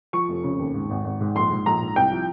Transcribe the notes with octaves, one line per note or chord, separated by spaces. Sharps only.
F3 C#6
F1
C#3
D#2
G#2
G#1
G#1
G#2
A#1 C6
G#2
A#1 A#5
G#2
C2 G5
F3